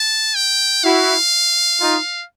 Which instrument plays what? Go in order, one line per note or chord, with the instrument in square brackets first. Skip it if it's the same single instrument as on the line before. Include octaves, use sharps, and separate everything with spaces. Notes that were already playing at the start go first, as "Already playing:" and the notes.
Already playing: [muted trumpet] A5
G5
[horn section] E4 F#4 [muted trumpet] F5
[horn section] D#4 F4